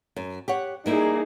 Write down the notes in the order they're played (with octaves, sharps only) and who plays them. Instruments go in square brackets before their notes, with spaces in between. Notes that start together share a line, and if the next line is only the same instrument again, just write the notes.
[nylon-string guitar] F#2
G4 C#5 F#5
[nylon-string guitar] G3 A#3 E4 [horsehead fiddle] D#4 G#4